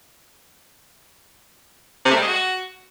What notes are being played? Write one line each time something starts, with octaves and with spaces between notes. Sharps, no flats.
C3
A3
G3
G#3
F#4